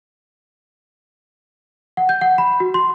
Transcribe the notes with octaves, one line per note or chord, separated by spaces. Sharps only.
F#5
G6
F#5
B5
F#4
C6